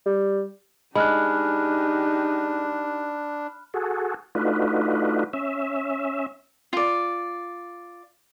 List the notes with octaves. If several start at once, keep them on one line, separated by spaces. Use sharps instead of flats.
G3
G#3 D4 D#4 G4 B5 F6 F#6
F#4 G#4 A4
A3 D4 D#4 F4 F#4 B4
C#4 E5
F4 D5